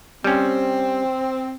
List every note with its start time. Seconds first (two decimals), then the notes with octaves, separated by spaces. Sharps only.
0.24 G3 C4 C#4